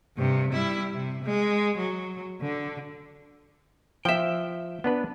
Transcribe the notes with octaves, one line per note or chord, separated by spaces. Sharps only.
G2 C3
G3 E4
C3
G#3
F#3
D3
F3 E5 G5
B3 D4 B4